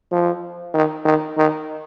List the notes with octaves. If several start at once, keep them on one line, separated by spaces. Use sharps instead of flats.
F3
D#3
D#3
D#3